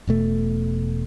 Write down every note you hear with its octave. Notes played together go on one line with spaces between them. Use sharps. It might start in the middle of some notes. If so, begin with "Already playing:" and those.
E1 B2 A3